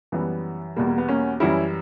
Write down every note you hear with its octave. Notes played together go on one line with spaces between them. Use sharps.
F#2 E3 G3 B3
E2 B2 G3 A#3
A#3
B3
A#3 C#4
F#2 E3 G3 C#4 E4